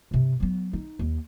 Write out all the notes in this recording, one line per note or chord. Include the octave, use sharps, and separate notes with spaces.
G2 C3
F#3 B3
D#4
D#2